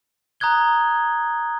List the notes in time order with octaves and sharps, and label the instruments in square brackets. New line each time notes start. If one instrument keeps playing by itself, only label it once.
[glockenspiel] A#5 D#6 F#6 G#6 G7